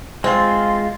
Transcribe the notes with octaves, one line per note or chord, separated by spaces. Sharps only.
G#3 C4 F4